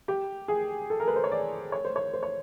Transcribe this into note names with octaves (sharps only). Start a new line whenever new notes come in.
G4
G#4
A4
A#4
B4
C5
C#5
D5
C#5
C5
C#5
C5
C#5